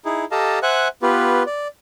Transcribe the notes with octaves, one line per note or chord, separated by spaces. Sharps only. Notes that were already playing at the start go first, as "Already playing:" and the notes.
D#4 E4 G#4
G4 A4 D#5 F5 A5 A#5
C5 E5 F#5 G#5 F#6
B3 F4 G4 B4
D5